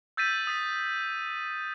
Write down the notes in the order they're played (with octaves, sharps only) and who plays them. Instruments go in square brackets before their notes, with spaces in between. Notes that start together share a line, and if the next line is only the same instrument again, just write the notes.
[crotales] E6 G6 A6 B6 D#7
D#6 A6 B6